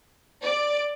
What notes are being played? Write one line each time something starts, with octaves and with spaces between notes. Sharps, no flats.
D5